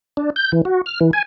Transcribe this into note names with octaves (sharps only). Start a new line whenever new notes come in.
D4
G6
E3
F#4
F6
E3
G#5